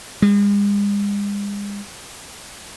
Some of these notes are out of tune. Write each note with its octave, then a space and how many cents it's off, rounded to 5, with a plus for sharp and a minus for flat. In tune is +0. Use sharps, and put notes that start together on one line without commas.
G#3 -45